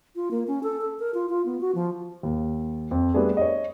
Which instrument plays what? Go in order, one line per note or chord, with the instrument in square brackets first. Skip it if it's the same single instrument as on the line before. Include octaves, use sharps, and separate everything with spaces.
[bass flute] F4
A#3
C#4
A4
A4
A#4
F4
F4
B3
F#4
F3
[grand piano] D#2
F2
G3 A3 B3 D4 G#4
C#5 D#5